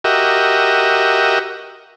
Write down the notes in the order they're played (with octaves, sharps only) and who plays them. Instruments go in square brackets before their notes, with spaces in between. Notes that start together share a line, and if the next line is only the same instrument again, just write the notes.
[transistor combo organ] F#4 G4 A#4 D#5 E5